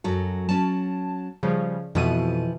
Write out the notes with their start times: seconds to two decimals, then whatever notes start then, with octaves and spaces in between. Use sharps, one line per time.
0.04 F#2 F#3 A4
0.49 F#3 C#4 A5
1.43 C#3 F3 G3
1.95 F2 B2 E3 F3 E4 D#7